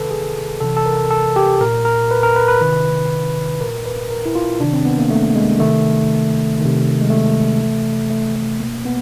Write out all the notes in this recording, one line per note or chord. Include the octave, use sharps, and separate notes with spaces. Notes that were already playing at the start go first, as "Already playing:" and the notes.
Already playing: C3 D#3 A4 B4
G#4
C3 E3 A4
A4
A#4
A4
G4
A#2 A#4
A#4
B4
A#4
B4
B4
C3 D#3
A#2 A#4
B4
A#4
E4
F4
C3 D#3 D4
C4
B3
A#3
A3
G#3
C3 D#3 A3
C3 D#3
G#3
A3
C3 E3
A3
A3
B2 A#3
B3